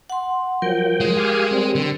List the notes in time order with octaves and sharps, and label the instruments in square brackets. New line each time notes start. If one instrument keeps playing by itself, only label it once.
[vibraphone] F#5 C6
[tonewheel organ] F3 F#3 G5 [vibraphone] A#4
[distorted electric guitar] G#3
[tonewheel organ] G4 F5 G#5
G3 C4
[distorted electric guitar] D3